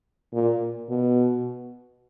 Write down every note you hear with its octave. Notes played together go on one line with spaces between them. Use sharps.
A#2
B2